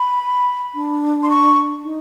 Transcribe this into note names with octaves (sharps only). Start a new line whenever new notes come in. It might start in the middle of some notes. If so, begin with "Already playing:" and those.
Already playing: B5
D4
C6
C#6
D#4